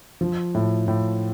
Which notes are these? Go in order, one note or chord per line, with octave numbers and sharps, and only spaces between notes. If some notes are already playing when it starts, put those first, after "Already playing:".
F3
A2
A2